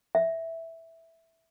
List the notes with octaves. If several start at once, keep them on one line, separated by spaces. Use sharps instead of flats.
E5